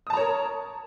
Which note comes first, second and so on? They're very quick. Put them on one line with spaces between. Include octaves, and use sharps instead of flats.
D#6 A5 A#5 C#5 A#4